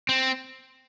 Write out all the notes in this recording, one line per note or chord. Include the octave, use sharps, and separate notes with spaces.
C4